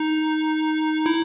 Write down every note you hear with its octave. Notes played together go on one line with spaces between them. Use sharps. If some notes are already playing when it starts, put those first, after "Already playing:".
Already playing: D#4
E4